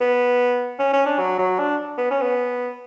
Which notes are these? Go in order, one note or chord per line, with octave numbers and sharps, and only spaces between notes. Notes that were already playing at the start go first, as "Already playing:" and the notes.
B3
C#4
C#4
D4
F#3
F#3
D4
B3
C#4
B3